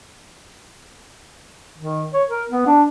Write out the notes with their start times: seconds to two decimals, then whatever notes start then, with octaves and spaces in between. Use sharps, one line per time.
1.78 D#3
2.14 C#5
2.29 A#4
2.50 B3
2.67 D4